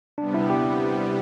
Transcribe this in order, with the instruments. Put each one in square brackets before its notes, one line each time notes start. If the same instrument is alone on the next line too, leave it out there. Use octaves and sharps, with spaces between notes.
[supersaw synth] C3 G3 B3 [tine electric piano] D4
[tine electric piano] E4
G4